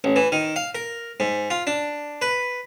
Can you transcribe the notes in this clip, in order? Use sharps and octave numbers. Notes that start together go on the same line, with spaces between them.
A1
E3
D#3
F5
A#4
G#2
F4
D4
B4